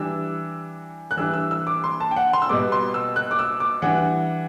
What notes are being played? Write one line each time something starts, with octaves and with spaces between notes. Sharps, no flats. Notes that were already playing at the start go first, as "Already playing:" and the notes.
Already playing: E3 G3 D4 E6
F#6
E3 G3 D4 E6
E6
E6
D6
C6
A5
G5
F#5
C6
E6
B2 G3 B3 D6
C6
E6
F#6
D6
E6
D6
E3 G3 D4 F#5